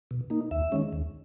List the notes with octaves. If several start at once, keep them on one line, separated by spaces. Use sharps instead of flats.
B2
A#3 D#4
D#2 E5
D#3 G#3 C#4
D#2